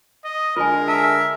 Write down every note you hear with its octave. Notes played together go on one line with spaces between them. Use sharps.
D#5
D3 G#3 F4 A#4 G#5
E5 A5